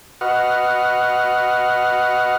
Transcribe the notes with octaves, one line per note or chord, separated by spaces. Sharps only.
F#4 B4 D#5 F#5 F6